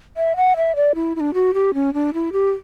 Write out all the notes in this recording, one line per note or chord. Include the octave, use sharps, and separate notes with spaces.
E5
F#5
E5
D5
E4
E4
D4
F#4
G4
C#4
D4
E4
G4